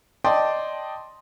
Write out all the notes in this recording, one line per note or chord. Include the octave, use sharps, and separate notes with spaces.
D5 D#5 G5 A5 C6